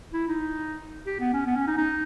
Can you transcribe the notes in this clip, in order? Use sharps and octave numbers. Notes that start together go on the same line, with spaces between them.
E4
D#4
G4
B3
C#4
B3
C#4
D#4
D#4